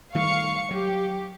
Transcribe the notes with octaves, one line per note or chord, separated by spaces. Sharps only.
D#3 G3 A3 F5 C#6 C#7
F#3 G4